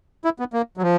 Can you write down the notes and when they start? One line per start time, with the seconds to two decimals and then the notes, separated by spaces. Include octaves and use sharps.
0.25 E4
0.39 B3
0.53 A#3
0.77 F#3
0.82 F3